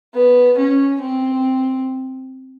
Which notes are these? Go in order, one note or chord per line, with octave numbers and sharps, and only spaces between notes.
B3
C#4
C4